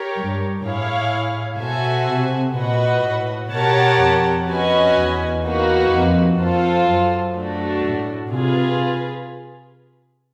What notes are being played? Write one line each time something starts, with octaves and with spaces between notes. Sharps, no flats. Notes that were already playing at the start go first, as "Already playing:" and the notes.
Already playing: G4 A#4 C#5
G2
A2 E4 G#4 C#5 F5
B2 F#4 A4 C5 E5 G#5
C3
A#2 F#4 B4 D#5 F#5
A2
B2 G4 A#4 C#5 F#5 A5
F2
C#4 F#4 B4 D#5 G#5
E2
A#3 D#4 F#4 B4
F2
F2 F4 A4 C5
F#2
A3 D4 F#4
A2
C3 F4 G#4 B4